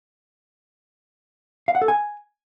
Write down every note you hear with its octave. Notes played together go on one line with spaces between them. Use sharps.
F5
F#5
A4
G#5